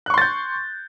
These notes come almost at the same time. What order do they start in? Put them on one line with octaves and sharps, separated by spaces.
F#6 C#6 C6 A6 G6